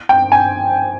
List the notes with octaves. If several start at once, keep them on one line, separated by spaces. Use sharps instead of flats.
G5
G#5